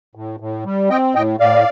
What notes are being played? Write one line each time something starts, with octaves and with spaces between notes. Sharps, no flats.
A2
A2
G3
C4 D#5 G5
A2 D#5 G5
A2 D5 F5